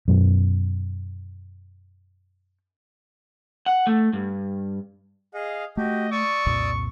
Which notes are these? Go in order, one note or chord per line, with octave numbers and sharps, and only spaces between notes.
F#2 B2
F#5
A3
G2
G#4 D#5 F5
A3 F#4 G4 D#5
D5 C#6 D#6 E6
C2 F2 A#2